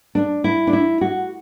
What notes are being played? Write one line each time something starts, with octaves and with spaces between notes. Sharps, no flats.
D4
E4
D4
E4
F#4